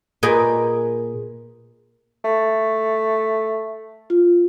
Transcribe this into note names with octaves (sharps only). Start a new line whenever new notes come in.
A#2 G#4 B4 D#5 G5
A3
F4